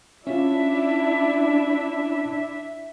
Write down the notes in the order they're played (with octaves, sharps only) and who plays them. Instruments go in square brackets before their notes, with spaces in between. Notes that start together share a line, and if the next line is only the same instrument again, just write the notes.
[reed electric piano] C#4 F4 [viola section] D4 E4 [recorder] E5